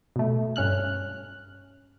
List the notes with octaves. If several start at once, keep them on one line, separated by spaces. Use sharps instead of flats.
B2 A3
G2 C#4 F6 F#6